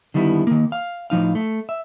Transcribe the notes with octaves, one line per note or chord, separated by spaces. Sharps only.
D3 D#3 G3 B3 E4
D#3 A#3
F5
A2 F3 D#4 F5
A3
E5